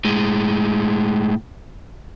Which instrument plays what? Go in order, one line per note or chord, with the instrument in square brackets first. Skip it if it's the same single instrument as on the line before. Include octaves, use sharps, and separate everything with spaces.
[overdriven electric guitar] A2 G#3